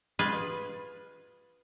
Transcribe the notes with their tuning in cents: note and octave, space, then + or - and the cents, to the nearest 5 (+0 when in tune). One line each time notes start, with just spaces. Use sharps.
F4 +20 G#4 +0 B4 +0